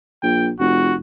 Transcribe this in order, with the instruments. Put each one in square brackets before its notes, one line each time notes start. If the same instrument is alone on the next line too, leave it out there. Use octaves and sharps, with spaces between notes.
[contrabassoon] A#1 [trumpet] G5
[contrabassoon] F1 [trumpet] F#4